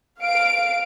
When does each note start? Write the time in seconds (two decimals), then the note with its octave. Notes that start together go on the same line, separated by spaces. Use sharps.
0.21 F5 D7